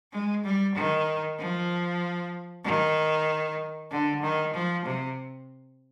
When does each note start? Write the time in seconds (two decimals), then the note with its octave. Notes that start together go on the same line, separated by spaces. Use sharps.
0.12 G#3
0.44 G3
0.75 D#3
1.38 F3
2.64 D#3
3.91 D3
4.22 D#3
4.54 F3
4.85 C3